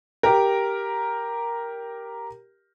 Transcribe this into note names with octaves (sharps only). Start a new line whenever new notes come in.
G4 A#4